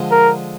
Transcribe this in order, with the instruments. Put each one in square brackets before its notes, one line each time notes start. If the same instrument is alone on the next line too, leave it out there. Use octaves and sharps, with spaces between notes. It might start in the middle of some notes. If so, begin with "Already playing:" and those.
Already playing: [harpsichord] D3 F3 G#3
[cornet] A#4